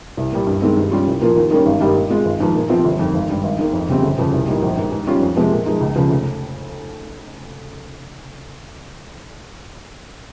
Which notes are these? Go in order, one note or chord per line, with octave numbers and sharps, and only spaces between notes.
C2
A#2 G3
G2
D#3 G#3 C4
G2
G3 C#4 F4
C2
A#2 F3 A#3 F4
D#2
D#3 G3 A#3 C#4
G#1
G2 G3 A#3 D#4
A#2
G#3 C4 F4
G#1
G#2 F3
A#2
F3 C4 F4
G1
F2 D#3
G#1
G2 G3
G#1
G#2 D#3 A#3
F2
C#3 G3 C4
G1
F2 C#3 F3
C2
A#2 G3 A#3 D#4
A#1
G#2 D#3
G#2
G3 C#4 F4
F2
C3 F3 G#3 C4
A#2
F3 G#3 D#4
C#2
C#3 F3
F1